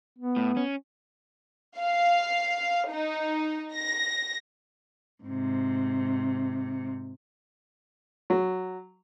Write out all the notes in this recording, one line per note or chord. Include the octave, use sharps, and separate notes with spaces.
B3
A2
C#4
F5
D#4
A#6
G#2 C3
F#3